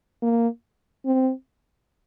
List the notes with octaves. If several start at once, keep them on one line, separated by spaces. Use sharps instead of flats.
A#3
C4